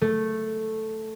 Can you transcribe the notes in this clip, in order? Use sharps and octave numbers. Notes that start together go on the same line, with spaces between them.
A3